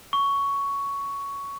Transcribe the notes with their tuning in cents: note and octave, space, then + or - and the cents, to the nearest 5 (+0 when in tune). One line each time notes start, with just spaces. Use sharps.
C#6 +10